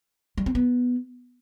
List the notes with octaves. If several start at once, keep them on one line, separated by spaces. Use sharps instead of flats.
G3
C4
B3